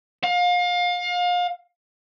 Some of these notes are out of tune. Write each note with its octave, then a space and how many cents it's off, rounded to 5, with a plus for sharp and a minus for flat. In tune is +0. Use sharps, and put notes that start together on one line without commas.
F5 +30